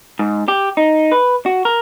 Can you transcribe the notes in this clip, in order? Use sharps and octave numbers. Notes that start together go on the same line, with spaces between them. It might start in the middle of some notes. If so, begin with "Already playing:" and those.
G#2
G4
D#4
B4
F#4
A#4